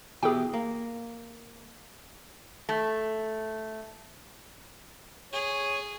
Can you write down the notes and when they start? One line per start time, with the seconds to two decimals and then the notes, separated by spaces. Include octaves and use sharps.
0.23 B2 E3 G4 G#4 G5
0.54 A#3
2.69 A3
5.33 G#4 C#5